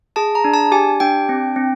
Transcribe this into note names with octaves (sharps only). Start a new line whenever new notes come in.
G#4 A5
A#5
D4
A5
G4 G#5
D4 G5
C4
C4